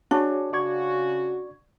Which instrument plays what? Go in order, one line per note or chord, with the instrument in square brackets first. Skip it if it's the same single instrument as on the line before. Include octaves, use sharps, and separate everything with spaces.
[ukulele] D4 [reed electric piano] F#4 G#4 C#5
[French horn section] C#3 F#4 [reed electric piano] D5 C#6 G#6